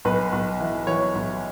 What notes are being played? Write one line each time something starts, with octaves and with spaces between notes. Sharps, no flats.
B1 B4
B1
E3
E3 C#5
B1